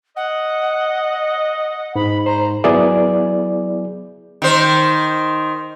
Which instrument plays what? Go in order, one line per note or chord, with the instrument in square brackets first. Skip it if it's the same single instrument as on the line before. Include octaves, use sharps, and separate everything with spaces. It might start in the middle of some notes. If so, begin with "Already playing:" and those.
[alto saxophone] D#5 [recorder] F#5
[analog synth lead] G#2 [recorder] B5
[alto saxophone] C5 [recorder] A#5
[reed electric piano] F#3 B3 E4 G#4 D5
[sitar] D#3 C5